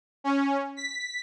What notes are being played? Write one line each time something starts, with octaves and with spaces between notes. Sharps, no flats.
C#4
B6